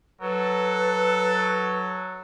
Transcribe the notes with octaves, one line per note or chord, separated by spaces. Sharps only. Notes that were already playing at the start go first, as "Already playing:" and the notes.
F#3 A4 B4